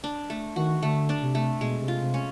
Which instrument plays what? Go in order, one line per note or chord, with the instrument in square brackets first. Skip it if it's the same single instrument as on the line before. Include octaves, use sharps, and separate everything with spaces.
[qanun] D4
A3
[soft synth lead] D#3 [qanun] F#4
[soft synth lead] D3 [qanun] A3
[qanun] D4
[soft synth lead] C3
[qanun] A3
[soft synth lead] B2 [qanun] G#3
[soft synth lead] C3
[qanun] F4
[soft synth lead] C3
[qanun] C#4